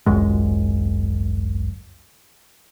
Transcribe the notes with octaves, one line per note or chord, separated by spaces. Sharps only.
G#1 C#2 F#2 G#3